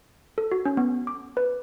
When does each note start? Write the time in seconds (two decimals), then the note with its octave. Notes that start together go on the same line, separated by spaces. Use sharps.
0.38 A4
0.52 F#4
0.65 C#4
0.77 B3
1.07 D6
1.37 B4